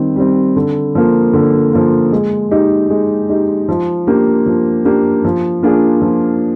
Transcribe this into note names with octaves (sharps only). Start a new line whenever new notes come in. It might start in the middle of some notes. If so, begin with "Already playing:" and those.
Already playing: D#3 G3 C4
G3 C4
D3
F3 A#3
D3
F3 A#3
G#3
D#4 G4
G#3
D#4 G4
F3
A#3 D4 G4
F3
A#3 D4 G4
F3
A#3 D4 F4 G#4
F3